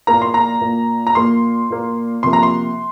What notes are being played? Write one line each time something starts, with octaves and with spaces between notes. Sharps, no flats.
A#2 A#3 A#5
C6
A#5
A#2 A#3
A#5
A#2 A#3 C6
A#2 A#3
C3 F3 A#3 C6
A#5
C6